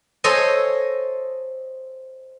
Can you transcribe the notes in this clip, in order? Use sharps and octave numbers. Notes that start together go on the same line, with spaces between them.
A4 C5 C#5 D#5 G#5